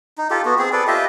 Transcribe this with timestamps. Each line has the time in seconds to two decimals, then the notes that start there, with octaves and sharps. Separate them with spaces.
0.18 D#4
0.30 F4 G4 A4
0.45 B3 F#4
0.59 C4 G#4
0.73 A4 B4 D5
0.87 F4 G4 D#5 E5